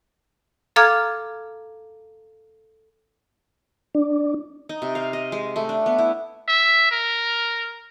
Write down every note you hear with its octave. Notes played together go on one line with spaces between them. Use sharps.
A4 F5 A#5 D6 F6 G#6
D4
D#4
C3
F5
D#5
G#3
A3
D4
B3
E4
E5
A#4